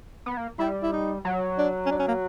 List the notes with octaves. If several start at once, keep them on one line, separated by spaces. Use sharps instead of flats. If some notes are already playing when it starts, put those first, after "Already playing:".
B3
A#3
G3 E4
E4
D#4
F#3
D4
C#4
D4
C#4
A#3